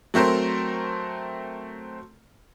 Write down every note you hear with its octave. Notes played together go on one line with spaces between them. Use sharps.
F#3 A3 C4 A#4 C5